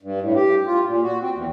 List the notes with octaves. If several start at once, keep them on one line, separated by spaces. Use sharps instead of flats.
G2
A2
G4
F4
A#2
F#4
C4
E2